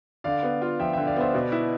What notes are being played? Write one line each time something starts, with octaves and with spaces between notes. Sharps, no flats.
D3 D5 F5
B3
F4
F3 E5 G5
E5 G5
D3
D5 F5
B3 C5 E5
B2 B4 D5
E4